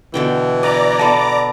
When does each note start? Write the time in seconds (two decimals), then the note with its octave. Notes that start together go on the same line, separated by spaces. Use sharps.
0.14 B2 D3 E3 G5
0.63 B4 D5 A#5 D6
0.99 B3 A4 A5 B5